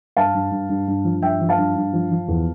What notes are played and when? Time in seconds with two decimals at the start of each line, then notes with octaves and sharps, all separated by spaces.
0.17 G2 F5 A5
0.34 G2
0.51 G2
0.69 G2
0.88 G2
1.04 F3
1.22 G2 E5 G5
1.41 F3
1.49 F5 A5
1.58 G2
1.76 G2
1.93 F3
2.11 F3
2.28 E2